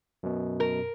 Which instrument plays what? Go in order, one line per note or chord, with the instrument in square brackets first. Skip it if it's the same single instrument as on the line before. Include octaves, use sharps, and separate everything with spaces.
[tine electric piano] F#2 B2
[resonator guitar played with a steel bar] A#4